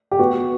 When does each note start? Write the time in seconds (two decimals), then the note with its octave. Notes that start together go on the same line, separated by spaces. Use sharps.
0.11 G4
0.19 B3 F#4